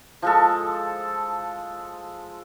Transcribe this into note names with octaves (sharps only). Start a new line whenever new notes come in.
F3 G#3 A4